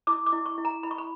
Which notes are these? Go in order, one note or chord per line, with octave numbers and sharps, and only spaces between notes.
E4 D6
D6
E4
C#6
E4
A#5
E4 B5
C#6
B5